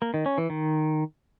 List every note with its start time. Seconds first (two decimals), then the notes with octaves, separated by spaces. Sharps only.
0.02 A#3
0.14 D#3
0.26 C#4
0.38 E3
0.50 D#3